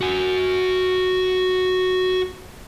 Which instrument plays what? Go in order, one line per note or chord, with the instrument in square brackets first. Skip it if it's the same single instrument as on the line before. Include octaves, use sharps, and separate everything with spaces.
[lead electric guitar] F#4 G#5